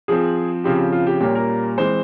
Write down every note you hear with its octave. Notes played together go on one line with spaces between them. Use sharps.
F3 C4 G#4
C#3 F3 C4 G4
F4
G4
A#2 G3 A#3 C#4 G4
A#4
E3 G#3 C4 C5